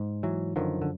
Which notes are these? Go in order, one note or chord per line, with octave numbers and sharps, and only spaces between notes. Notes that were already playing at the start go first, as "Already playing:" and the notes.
Already playing: G#2
E3 F#3
F#2 D3 D#3 F3
D3